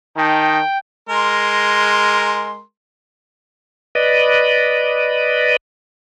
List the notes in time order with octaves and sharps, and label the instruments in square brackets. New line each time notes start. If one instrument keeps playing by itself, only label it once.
[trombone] D#3 [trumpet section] D#4 A5 [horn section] G5
[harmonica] G#3 A#4 C6
[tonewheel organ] B4 D5 D#5